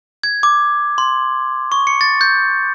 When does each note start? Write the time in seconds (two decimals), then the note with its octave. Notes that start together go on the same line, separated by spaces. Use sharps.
0.24 G#6
0.43 D6
0.98 C6
1.72 C#6
1.87 C#7
2.01 A6
2.21 G6